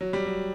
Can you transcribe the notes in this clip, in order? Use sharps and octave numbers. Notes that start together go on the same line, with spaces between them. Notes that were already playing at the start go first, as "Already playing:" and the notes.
F#3
G3
F#3